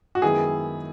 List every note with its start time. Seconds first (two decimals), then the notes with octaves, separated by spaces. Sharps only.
0.15 F#4
0.22 F#2 D#3 G#3 B3 E4 G#4